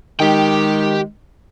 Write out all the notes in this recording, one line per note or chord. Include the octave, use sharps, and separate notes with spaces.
D#3 G#3 G4 G5